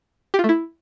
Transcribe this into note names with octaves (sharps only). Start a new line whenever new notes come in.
G4
F4
A3
E4